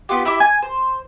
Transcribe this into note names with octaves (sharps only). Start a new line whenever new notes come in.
B3 F4 G4
E4 G4 E5 D6
G#5
C5